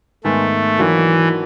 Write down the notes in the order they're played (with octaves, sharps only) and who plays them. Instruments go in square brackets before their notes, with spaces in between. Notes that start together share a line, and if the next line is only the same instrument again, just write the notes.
[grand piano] G#2 D#3 G#3 B3 D#4 [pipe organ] A3
[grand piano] D#3 F#3 A#3 D4 F#4 [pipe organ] E3